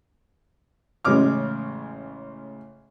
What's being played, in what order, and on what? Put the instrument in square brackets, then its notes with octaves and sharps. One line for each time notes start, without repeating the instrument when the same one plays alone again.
[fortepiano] A1 C#3 G#3 C#4 D6 F6